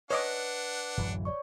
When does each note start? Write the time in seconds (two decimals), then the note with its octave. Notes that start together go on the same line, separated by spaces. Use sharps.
0.11 D4 B4 C#5 D#5 F#5 D6
0.97 D1 F#2 E3
1.25 C#5 D5 C#6